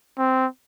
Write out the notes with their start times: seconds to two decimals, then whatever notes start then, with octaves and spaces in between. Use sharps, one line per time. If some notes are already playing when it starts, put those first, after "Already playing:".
0.18 C4